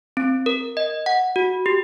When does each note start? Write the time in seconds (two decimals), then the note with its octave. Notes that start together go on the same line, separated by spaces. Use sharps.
0.17 C4
0.46 A#4
0.77 D#5
1.06 F#5
1.36 F#4
1.66 G4